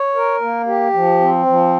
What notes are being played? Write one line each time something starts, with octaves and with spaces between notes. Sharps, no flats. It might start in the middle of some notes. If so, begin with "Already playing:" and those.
Already playing: C#5
A#4
A#3
G4
F3
C4
F3